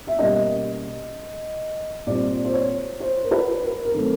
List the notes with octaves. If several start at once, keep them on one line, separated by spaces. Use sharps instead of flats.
E5
B2 G3 A#3 C#4 D#5
A#2 G3 C4 D5
C5
C#5
C5
A#4
B4
A#4
A#4
D#3 F#3 A3 C4 A4